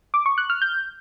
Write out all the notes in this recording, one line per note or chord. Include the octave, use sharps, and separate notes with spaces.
D6
C#6
F#6
F6
G6